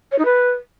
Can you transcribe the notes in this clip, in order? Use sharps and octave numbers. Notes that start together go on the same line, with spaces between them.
C#5
D#4
B4